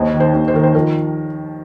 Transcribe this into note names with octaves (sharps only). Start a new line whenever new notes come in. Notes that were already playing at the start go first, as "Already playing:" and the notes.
Already playing: D#2 C5 D#5
D#3
C5
D#2
C5
D#3 A#4
C5
F3 A#4